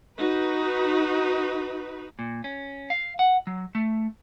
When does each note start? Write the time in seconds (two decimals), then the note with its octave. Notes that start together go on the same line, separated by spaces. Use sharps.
0.17 D#4 F#4 B4
2.19 A#2
2.44 C#4
2.90 F5
3.19 F#5
3.47 F#3
3.75 A3